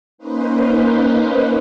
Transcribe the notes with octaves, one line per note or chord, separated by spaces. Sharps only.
A#3 C#4 D#4 B4 C5